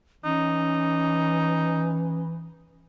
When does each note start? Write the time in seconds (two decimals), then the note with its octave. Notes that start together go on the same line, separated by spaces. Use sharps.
0.25 E3 C#4 D#4